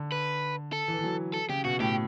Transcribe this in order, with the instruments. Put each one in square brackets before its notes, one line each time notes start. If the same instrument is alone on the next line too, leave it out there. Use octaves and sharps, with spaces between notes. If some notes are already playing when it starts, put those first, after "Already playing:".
Already playing: [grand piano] D3
[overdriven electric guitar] B4
A4
[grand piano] E3
E3
F#3
[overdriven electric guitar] A4
[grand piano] C#3 [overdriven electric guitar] G4
[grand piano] B2 [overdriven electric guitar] F#4
[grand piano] A2 [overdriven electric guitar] G4